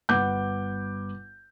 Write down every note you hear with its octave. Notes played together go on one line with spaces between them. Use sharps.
G1 B4 F#5 D6 G6